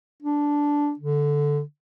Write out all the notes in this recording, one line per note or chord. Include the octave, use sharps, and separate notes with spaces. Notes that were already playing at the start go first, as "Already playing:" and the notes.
D4
D3